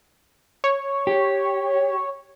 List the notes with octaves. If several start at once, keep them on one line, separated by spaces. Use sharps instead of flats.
C#5
G4